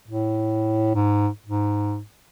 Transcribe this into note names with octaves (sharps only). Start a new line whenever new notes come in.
A2
G#2
G#2